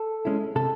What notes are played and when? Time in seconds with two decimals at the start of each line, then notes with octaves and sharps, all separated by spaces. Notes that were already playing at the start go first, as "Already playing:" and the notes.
Already playing: A4
0.25 G#3 C#4 E4
0.55 C3 A4